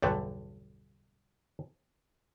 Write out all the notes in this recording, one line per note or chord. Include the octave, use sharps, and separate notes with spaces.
B1 E2 G2 D3 A3